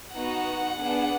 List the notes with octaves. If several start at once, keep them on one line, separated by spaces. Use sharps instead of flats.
B3 D#4 F#4 F#5
B3 D4 G#4